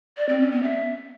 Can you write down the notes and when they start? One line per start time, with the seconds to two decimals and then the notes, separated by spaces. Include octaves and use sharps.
0.17 D5
0.29 C4
0.40 C#4
0.52 B3
0.63 E5